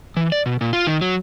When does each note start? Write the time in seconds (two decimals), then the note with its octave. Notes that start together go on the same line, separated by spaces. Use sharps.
0.17 E3
0.32 D5
0.46 B2
0.61 A#2
0.73 F4
0.87 D#3
1.01 F#3